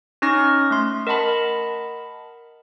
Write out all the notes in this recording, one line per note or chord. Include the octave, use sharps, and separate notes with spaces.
C#4 D#4 C#6 F6 A#6
A3 C6
A#4 D#5 F#5 A5 B5